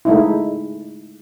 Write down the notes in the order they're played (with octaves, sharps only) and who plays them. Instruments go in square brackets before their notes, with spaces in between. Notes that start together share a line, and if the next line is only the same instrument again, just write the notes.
[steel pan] G#3 A3 D#4 E4